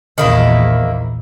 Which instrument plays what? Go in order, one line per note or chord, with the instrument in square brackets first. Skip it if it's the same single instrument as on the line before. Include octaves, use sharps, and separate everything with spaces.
[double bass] A#1 E2 [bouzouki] D#3 A#3 E4